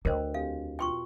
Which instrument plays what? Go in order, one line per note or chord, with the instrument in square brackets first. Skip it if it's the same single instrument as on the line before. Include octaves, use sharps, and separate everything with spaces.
[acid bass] D2 [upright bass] D4 [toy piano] A#4 C5 [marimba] C#5 D#5 G5
[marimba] E2 C4 G4 [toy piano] F5
[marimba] B2 F4 F#4 [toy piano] G5 C6 C#6